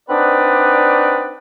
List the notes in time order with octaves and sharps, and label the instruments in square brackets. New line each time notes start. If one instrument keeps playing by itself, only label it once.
[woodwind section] C4 D4 D#4 B4 D5 F#5